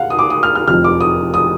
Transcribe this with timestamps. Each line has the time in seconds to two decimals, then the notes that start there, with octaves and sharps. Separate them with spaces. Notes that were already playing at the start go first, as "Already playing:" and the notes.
Already playing: F5 F#5
0.10 D#6
0.19 D6
0.30 D#6
0.43 F6
0.55 F6
0.67 F1 F2 F3 F6
0.84 D6
1.01 D#6
1.34 D#6